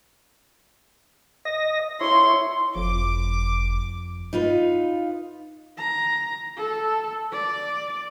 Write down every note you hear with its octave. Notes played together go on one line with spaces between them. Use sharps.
D#5 A#6
E4 C#5 C6
F#1 F2 D6
D#4 F4 B4
A#5
A4
D5